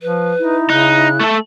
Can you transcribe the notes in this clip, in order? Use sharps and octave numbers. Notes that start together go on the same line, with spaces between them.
F3 B4
D#4 E4
C#3 D#4 F#6
A3 A4